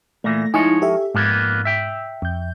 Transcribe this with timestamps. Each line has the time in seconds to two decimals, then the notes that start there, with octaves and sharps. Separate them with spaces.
0.24 A#2 E3 A3 A#6
0.54 F3 G#3 D#4 E4 C#5 G#5
0.82 G4 A4 E5
1.15 F2 G#2 A#3 B3
1.65 E5 G5
2.22 F2 G6